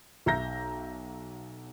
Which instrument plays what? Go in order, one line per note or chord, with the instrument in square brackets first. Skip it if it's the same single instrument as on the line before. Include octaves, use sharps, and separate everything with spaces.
[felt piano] B1 E5 A#5 G6 A#6